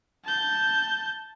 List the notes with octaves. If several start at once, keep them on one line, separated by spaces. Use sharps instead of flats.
A5 G6